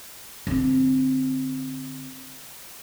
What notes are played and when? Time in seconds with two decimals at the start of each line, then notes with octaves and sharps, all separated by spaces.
0.47 D3 C4